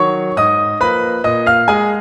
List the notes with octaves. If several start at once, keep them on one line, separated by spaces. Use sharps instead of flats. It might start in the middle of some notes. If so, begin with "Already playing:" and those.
Already playing: D#3 F#3 C#5 C#6
G#2 D#5 D#6
F3 A#3 B4 B5
A#2 D#5 D#6
F5 F6
G#3 G#4 G#5